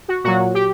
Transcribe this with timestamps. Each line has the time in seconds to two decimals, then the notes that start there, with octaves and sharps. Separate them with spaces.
0.08 F#4
0.24 A#2 F#3 F#4
0.54 G4